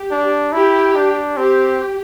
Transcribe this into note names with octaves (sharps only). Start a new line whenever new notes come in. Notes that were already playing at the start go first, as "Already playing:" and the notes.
Already playing: G4
D4
E4 G4
D4
C4 G4